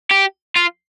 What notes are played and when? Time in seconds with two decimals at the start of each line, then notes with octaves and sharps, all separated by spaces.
0.11 G4
0.56 F4